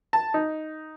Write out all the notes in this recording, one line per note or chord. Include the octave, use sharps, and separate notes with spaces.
A5
D#4